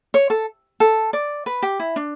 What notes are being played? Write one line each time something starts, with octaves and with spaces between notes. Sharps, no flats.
C#5
A4
A4
D5
B4
G4
E4
D4